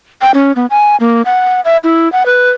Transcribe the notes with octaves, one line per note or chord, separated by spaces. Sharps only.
G5
C#4
B3
G#5
A#3
F#5
E5
E4
F#5
B4